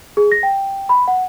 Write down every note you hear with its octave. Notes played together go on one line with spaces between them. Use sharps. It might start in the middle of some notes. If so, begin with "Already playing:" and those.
G#4
A#6
G5
B5
F#5